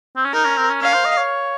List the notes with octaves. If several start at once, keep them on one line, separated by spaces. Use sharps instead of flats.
C4
C#4
D#4 A#4
C#4
C4
C#4
C#4 F5
C5
D#5
C#5